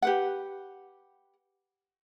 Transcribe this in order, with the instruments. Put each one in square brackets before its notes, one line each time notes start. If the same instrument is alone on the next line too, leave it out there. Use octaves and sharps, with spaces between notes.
[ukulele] G4 B4 F#5